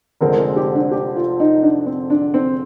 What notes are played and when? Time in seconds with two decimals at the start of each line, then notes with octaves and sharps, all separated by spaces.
0.21 F1 F2 D3 G#3 C4 A#4
0.38 G#4
0.56 G4
0.74 D4
0.91 G4
1.16 F4
1.40 D#4
1.63 D4
1.86 C4
2.10 D4
2.34 C4